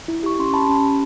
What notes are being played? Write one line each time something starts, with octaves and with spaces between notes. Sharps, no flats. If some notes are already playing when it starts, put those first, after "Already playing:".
E4
G4 C#6
C#4 C6
G4 A5 B5
C#4
G4